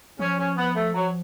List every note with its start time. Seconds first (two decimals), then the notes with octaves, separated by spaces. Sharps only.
0.19 F3 C#4
0.38 C#4
0.57 B3
0.75 A3
0.94 F#3